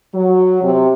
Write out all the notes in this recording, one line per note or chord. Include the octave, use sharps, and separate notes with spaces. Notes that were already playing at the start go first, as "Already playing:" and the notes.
F#3
C3